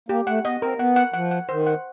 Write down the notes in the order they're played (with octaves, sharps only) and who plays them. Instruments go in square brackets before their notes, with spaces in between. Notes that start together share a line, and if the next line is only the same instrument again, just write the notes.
[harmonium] A#3 [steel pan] G4
[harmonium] A3 [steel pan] F#5
[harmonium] B3 [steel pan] D#5
[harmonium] C4 [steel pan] A#4
[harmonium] B3 [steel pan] F#5
[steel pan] F#5
[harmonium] F3 [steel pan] F#5
[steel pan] F#5
[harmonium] D#3 [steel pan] C5
[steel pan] F#5